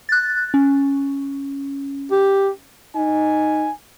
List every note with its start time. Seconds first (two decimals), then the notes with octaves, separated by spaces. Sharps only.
0.09 F#6 A6
0.54 C#4
2.11 G4
2.95 D#4 G#5